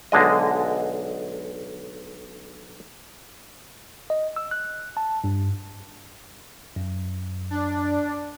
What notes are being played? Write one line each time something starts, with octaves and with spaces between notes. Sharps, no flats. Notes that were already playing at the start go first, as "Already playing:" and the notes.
B1 D3 G#3 D#5
D#5
E6
F#6
A5
G2
F#2
D4